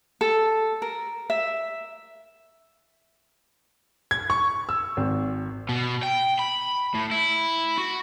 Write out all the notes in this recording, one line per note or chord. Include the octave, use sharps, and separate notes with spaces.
A4
A#4
E5
G#6
C#6
E6
G#1
B2
G5
B5
A2
E4
F#4